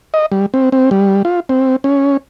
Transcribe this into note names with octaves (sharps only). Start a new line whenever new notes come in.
D#5
G3
C4
C4
G3
F4
C4
C#4